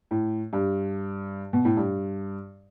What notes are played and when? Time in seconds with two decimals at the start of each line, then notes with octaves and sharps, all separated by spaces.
0.11 A2
0.53 G2
1.53 B2
1.65 A2
1.77 G2